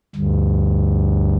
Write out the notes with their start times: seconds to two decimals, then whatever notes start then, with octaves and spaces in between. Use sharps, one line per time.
0.15 D2 G2